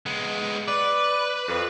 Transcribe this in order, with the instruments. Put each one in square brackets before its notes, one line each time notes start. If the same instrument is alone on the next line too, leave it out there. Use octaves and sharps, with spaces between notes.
[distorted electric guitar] G#3 B3
[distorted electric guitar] B4 [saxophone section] D5
[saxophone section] F2